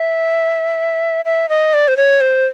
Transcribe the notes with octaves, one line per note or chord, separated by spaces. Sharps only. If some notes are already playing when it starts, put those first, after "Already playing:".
Already playing: E5
E5
D#5
D5
C5
C#5
C5